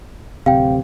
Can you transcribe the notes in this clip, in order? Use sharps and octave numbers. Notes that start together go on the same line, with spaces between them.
D1 C3 F5 G5